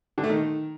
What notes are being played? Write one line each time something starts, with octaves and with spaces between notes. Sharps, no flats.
D3
A3
D#3